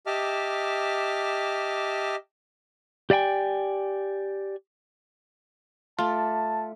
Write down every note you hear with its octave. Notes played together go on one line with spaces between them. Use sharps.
G4 D#5 E5 A5 D6 F6
G4 D5 E5 G5 G#5
A3 F4 D5 A5